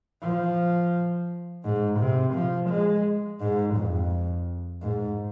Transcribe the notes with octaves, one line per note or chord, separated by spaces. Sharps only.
F3
G#2
C3
F3
G#3
G#2
F2
G#2